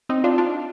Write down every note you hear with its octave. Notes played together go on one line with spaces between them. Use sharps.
C4 D#4
D4 F4
D4 F4